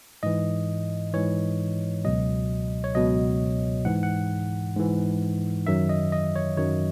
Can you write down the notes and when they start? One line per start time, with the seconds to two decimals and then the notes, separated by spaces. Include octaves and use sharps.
0.23 G#2 E3 D#5
1.13 G#2 E3 C#5
2.05 C#2 B2 F#3 D#5
2.84 C#5
2.95 C#2 B2 F#3 D#5
3.85 G#2 E3 F#5
4.03 F#5
4.76 G#2 E3
5.67 F#2 D#3 F#3 E5
5.89 D#5
6.12 D#5
6.36 C#5
6.57 F#2 D#3 F#3 C#5